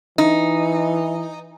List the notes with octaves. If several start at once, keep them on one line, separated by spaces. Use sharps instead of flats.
E3 D#4